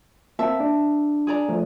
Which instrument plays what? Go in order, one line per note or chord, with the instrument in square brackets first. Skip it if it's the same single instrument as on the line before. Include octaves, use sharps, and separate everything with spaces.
[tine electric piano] A#3 C4 [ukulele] E5 A5
[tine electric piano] D4
[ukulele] G#4 D5 A#5
[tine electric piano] F3 A3